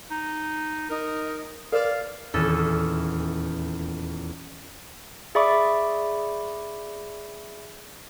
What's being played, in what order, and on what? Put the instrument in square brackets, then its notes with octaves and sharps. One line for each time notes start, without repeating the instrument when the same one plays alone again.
[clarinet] D#4
[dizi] D#4 [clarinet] A#4
[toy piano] A#4 B4 [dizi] D5 [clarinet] F5
[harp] D#1 E2 C#4 A4 E6
[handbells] G#4 D5 E5 B5 C#6 D6